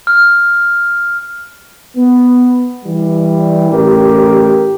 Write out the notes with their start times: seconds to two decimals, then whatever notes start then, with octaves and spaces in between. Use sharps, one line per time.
0.07 F6
1.97 B3
2.85 E3 G3
3.71 A1 G4 A#4